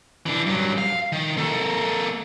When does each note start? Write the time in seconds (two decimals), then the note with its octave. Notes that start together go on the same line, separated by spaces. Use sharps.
0.26 E3 D4
0.46 G2 F#3
0.78 F5
1.12 D#3
1.37 A#3 A4